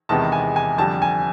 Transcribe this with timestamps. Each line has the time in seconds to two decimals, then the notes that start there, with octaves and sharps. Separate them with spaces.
0.09 E2 C3 D#3 G#3 B3 A5
0.32 G#5
0.56 G#5
0.78 F2 D3 G3 A5
1.02 G#5